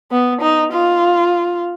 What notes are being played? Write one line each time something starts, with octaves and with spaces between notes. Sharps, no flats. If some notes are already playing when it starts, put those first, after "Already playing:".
B3
D#4
F4